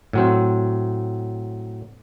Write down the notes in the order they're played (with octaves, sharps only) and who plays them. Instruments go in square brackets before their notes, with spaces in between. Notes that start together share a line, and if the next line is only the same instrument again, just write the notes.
[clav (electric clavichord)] A2 F#3 C4